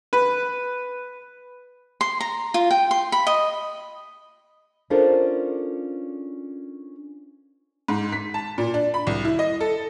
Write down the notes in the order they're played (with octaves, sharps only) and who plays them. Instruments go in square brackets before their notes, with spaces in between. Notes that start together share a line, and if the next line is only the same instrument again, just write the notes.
[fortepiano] B4
[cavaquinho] C6
A#5
F4
G5
C6
B5
D#5
[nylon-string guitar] C#4 D4 F4 A4 A#4 C5
[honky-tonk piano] G#2
B6
A5
A#2
D4
B5
C2
E4
D#5
A4